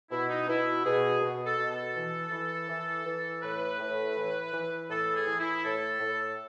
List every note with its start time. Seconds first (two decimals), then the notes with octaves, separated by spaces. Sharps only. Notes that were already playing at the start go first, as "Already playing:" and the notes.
0.11 B2 E4
0.29 D#4
0.47 B2 E4
0.85 B2 G#4
1.21 B2
1.46 A4
1.58 B2
1.70 A4
1.96 E3
2.31 E3
2.69 E3
3.06 E3
3.42 A2 B4
3.80 A2
4.16 E3
4.53 E3
4.90 A2 A4
5.15 G#4
5.26 E3
5.39 E4
5.64 A2 A4
6.00 A2